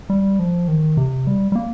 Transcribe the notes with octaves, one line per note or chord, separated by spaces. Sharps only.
G3
F3
D#3
C3
G3
G3
A#3